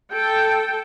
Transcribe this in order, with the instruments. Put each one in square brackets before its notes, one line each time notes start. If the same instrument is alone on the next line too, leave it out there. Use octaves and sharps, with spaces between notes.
[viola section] A4 G5